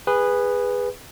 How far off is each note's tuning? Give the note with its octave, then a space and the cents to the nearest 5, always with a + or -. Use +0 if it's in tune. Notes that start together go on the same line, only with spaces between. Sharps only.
G#4 -20 B4 +0